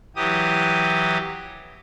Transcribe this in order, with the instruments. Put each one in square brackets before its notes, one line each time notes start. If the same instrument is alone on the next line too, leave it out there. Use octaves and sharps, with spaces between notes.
[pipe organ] E3 F#3 G4 D#6